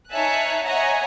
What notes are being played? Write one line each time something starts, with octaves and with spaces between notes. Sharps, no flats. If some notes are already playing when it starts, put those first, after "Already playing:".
D#4 C#5 E5 G#5 A5 F#6
C#5 D#5 E5 F#5 G#5 A#5